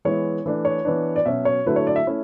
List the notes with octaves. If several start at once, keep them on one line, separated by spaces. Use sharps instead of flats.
E3 G#3 B3 E4 C#5
E3 A3 D4
C#5
E3 B3 D4
D5
B2 F#3 C#4 E5
C#5
D3 F#3 A3 E4 B4
C#5
D5
E5
A3 C#4 E4